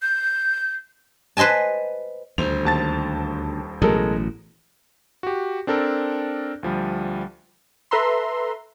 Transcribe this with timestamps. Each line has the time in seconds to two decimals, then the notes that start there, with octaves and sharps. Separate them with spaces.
0.02 G6
1.37 B4 C5 D#5 G#5 A5
2.38 D#1 D2 C5 F7
2.65 D#2 A5 A6
3.82 A1 B2 F#3 G#3 A4 A#4
5.23 F#4 G4
5.67 C4 D4 A4 A#4
6.63 D2 F3 G3
7.91 A4 B4 E5 A#5 C6